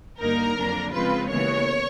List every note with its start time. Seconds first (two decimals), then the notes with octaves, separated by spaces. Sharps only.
0.19 G2 D3 G3 A#3 D#4 A#4
0.56 F2 D3 F#3 A#3 D4
0.92 C#3 F3 G#3 C4 F4 B4
1.29 D#2 C#3 E3 G#3 B3 C#5